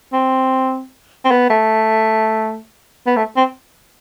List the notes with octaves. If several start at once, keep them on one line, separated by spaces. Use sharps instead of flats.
C4
C4
B3
A3
B3
A3
C4